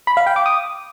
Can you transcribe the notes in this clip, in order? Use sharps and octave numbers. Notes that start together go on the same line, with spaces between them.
B5
F5
G5
D6
D#6